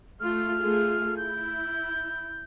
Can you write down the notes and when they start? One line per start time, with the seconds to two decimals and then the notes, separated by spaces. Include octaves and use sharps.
0.20 A3 F4 F6
0.59 A3 F4 G#4
1.17 E4 G6